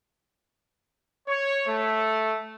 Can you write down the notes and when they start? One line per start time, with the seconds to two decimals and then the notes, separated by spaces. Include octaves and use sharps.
1.27 C#5
1.66 A3